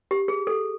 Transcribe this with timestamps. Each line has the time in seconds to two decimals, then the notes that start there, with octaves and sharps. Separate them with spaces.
0.11 G4
0.28 G#4
0.47 A4